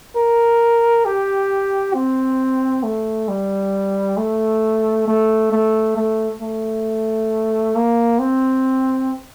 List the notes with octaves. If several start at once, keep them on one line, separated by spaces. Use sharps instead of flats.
A#4
G4
C4
A3
G3
A3
A3
A3
A3
A3
A#3
C4